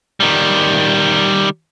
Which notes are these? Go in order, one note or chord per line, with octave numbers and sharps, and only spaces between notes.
D#3 G3